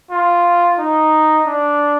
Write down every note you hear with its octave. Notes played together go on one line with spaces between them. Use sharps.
F4
D#4
D4